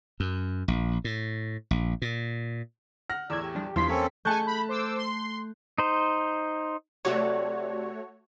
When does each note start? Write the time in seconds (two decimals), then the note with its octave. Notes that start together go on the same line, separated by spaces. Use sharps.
0.20 F#2
0.68 A#1
1.04 A2
1.71 A#1
2.02 A#2
3.10 F#5 F6 A#6
3.30 E2 A2 D5 E6 G#6
3.42 G4
3.55 F3 G3 D4
3.76 E2 G2 E3 F3 C6 B6
3.89 A#3 C4 C#4 A4 C#5
4.25 A3 G#5 A5 C#6 F#6 G6
4.47 B5
4.69 C5 D6 E6
4.97 C6
5.78 D#4 C5
7.05 C3 F#3 A3 F#4 C#5 D5